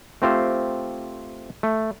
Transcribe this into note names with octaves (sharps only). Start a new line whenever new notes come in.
A3 C4 F4 G4 C5
A3